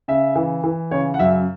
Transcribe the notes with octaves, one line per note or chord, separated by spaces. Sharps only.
C#3 E5
E3
E3
C#3 C#5
F#5
F#2 E5